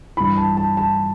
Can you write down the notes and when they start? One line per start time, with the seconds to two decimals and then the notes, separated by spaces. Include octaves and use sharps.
0.17 G2 E3 B5
0.37 A5
0.57 A5
0.77 A5